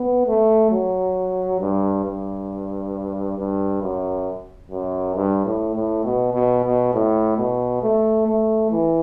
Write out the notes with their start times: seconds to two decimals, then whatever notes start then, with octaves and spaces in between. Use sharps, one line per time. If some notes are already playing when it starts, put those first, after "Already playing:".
Already playing: B3
0.27 A3
0.71 F#3
1.60 G2
2.05 G2
3.38 G2
3.82 F#2
4.71 F#2
5.16 G2
5.45 A2
5.75 A2
6.05 B2
6.34 B2
6.64 B2
6.94 A2
7.38 B2
7.83 A3
8.27 A3
8.71 E3